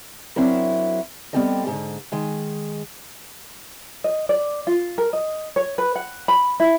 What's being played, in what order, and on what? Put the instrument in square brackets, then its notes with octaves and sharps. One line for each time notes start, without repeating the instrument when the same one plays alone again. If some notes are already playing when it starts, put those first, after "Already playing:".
[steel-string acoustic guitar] F#3 C4 D4 E4 A#4
G3 B3 C4 G4 A4 D#5
G#2 D3
D#3 G#3
[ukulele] D#5
D5
F4
A#4
D#5
C#5
B4
F#5
B5
E4